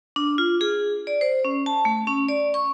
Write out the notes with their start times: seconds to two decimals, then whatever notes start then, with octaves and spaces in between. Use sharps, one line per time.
0.16 D4
0.38 F4
0.61 G#4
1.07 D5
1.21 C5
1.45 C#4
1.66 A5
1.85 A3
2.07 C#4
2.28 D5
2.54 C#6